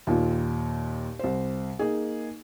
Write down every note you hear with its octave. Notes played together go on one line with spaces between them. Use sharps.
D#2 A#2 F4
C2 C5
A#3 D#4 G#4